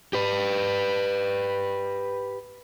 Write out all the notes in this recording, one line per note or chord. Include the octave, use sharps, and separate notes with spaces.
G4 B4